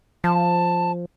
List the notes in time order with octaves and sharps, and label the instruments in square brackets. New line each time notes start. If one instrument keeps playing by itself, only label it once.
[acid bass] F3 [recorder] A5